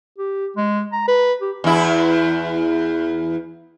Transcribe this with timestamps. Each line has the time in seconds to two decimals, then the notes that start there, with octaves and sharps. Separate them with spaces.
0.18 G4
0.57 G#3
0.92 A#5
1.08 B4
1.41 G4
1.64 E2 E4